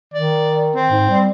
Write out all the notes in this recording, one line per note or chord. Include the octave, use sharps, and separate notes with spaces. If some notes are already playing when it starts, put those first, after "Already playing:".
D#3 D5
C4
G#2
G3